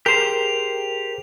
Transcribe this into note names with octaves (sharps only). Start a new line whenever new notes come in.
G4 G#4 A#4 C5 F7